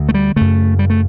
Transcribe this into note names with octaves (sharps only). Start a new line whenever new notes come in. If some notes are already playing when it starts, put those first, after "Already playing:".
Already playing: D2 D3
A3
G3
F#2 C#3 A3
G3
A3